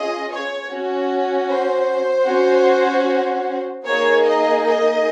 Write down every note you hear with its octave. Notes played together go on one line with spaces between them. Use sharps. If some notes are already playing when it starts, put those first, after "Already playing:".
Already playing: C#4 F4 G#4 D#5
C#5
C#4 F#4
C5
C#4 F#4
A#3 D#4 G#4 C#5
D#5
D#5